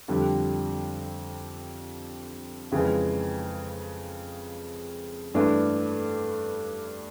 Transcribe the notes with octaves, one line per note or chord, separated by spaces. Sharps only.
F2 D3 G3
F2 C#3 E3 G#3
G2 E3 A3 D4